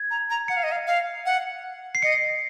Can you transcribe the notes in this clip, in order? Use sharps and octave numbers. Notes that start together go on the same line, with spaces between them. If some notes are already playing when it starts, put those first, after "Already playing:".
Already playing: G#6
A#5
A#5
F#5 C#7
F5
D#5
F5
F5
F#5
C7
D#5 C#7